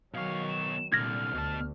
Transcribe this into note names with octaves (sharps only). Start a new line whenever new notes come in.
B2 D#3 F#3 C#5 F5
E7
C2 A#2 D3 F6 G#6 A#6
D2 B2 A5